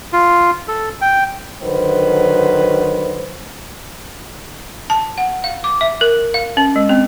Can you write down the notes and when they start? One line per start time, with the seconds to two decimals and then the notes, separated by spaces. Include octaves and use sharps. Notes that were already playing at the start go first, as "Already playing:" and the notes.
0.13 F4
0.68 A4
1.01 G5
1.61 D3 D#3 F#3 B4 C5
4.90 A5
5.18 F#5
5.44 F5
5.64 D6
5.81 E5
6.01 A#4
6.34 F5
6.57 C#4
6.76 G#3
6.89 C4